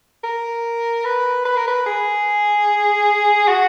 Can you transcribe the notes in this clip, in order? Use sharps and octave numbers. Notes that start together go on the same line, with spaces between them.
A#4
B4
B4
A#4
B4
G#4
F#4